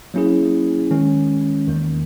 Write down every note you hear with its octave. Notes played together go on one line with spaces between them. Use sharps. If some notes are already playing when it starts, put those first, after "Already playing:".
F#3 A#3 C#4 E4 G#4
D#3 G#3 C#4
E2 D#3 A#3